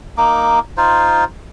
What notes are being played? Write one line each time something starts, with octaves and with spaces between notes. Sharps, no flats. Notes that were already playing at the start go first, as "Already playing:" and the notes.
A#3 D#4 D6
D#4 F4 C5